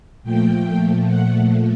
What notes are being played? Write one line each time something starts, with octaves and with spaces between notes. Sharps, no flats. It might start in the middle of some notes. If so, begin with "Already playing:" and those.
A#2 F3 A3 G5
F#5